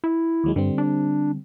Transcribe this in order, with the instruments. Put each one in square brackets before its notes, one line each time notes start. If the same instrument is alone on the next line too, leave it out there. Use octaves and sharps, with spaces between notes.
[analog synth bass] E4
[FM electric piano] D#2 F#3 G#3
[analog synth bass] G2 [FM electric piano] D3 G3 C4
[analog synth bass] D4